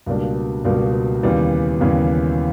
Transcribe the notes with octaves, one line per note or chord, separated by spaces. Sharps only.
C#2 B2 G3 A#3 D4
C#2 B2 G3 A#3 D4
D#2 C#3 E3 G3 B3
D#2 C#3 E3 G3 B3